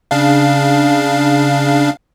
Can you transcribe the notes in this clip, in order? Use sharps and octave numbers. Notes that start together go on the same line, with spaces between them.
C#3 D4 F5